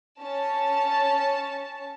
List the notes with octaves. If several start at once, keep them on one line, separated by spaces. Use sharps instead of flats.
C#4 A5